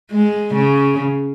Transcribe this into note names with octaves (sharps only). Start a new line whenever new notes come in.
G#3
C#3